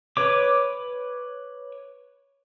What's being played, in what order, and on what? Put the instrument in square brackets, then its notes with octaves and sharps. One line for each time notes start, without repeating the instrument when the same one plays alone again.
[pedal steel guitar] B4 C#5 D6